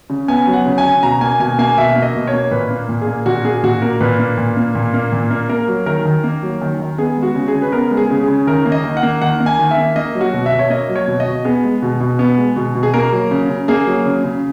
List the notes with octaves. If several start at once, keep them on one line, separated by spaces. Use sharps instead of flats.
C#3
B3 G#5
F#3
F#5
C#3
G#5
C#3
B2 A#5
A#3 G#5
B2 G#5
A#3 G#5
B2 E5
A#3
D#5
B2
C#5
A#3
A#2 B4
A#3
A#2
G#4
A#3
A#2 F#4
A#3 G#4
A#2 F#4
A#3 A#4
A#2 B4
A#3
A#2
A#3
A#2
A#3
A#2
A#3
A#3 A#4
F#3
D#3 A#4
D#3
A#3
F#3
D#3
D#3
B3 G#4
G#3
F#4
C#3
G#4
C#3
B4
B3 A#4
G#3
G#4
C#3
G#4
C#3
D#3 A#4
A#3
D#5
D#3
F#5
A#3
D#3 F#5
A#3
G#5
D#3
E5
A#3
A#3 D#5
F#3
F#4
B2
E5
B2
C#5
A#3 D#5
F#3
C#5
B2
D#5
B2
B3 G#4
G#3
B2
B2
B3
G#3
B2
B2
G#4
A#3 A#4
F#3
C#3
C#3
A#3 G#4
F#3
C#3
C#3